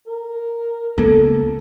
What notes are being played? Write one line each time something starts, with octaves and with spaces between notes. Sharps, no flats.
A#4
C#2 A#3 B3 A4